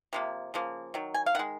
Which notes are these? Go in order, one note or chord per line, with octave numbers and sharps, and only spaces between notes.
C3 F3 A#3
C#3 F3 A#3
D#3 F#3
G#5
F5
D#3 G#3 F#5